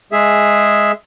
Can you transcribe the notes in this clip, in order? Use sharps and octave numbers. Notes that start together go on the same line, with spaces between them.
G#3 G#4 E5